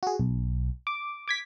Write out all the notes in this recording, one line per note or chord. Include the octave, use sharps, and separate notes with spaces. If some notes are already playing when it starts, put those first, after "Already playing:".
F#4 G#4
B1
D6
D6 G#6 B6